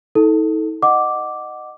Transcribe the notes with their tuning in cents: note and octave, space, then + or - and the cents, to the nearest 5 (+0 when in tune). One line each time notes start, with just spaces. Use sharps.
D#4 +45 A4 -5
D#5 -15 F#5 +0 D6 -5